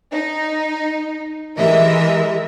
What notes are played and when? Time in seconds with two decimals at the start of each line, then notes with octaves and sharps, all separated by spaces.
0.12 D#4
1.58 E3 G#3 G4 A#4 D#5 E5